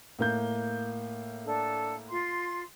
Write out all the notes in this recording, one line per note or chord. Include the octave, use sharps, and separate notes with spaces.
A2 A#3 G6
D4 A4
F4 C6